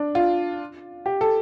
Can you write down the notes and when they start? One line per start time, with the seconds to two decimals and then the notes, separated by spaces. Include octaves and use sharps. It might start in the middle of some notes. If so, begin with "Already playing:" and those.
Already playing: D4
0.15 F4
1.06 G4
1.21 A4